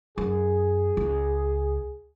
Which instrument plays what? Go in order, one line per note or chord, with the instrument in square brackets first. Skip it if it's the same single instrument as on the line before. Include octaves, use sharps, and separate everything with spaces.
[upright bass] F#2 [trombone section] G#4
[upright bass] C#2